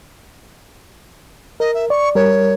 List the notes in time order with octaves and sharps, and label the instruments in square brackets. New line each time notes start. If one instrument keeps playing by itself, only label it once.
[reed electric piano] A#4 [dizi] D#5
[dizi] E5
[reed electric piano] D5 [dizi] C#6
[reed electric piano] G3 A#4 [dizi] C#5